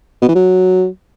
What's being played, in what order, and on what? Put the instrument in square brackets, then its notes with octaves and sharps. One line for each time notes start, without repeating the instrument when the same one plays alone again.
[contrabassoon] B2
E3
F#3